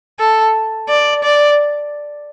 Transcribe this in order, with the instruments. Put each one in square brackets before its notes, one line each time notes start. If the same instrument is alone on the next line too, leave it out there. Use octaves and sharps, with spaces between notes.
[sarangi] A4
D5
D5